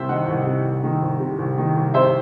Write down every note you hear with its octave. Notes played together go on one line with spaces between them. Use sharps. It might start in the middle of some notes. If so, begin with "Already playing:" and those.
Already playing: C2 C3 C5 E5
D#3 D#5 F#5
C2
C3
C2
D#3
C2
C3
C2
D#3
C2
C3 C5 E5